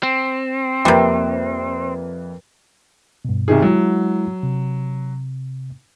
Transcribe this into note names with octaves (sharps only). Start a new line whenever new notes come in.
C4
F2 C3 G3 A#3 B4
G2 B2
C2 D#3 G#4
F#3 G#3 E4
C3